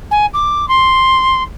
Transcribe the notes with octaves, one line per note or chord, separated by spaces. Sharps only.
G#5
D6
C6